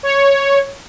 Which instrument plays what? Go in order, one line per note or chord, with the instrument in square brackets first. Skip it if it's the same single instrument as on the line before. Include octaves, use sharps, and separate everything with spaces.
[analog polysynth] C#5